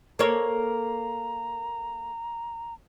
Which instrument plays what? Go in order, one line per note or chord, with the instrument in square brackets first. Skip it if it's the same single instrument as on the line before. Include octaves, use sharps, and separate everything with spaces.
[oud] A#3 A4 C#5 [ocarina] A#5